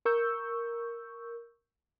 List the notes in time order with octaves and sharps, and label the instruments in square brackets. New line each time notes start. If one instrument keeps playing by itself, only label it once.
[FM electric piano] A#4 C#6 E6 G6